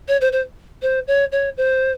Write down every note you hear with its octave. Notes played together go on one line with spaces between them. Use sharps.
C#5
C5
C5
C5
C#5
C#5
C5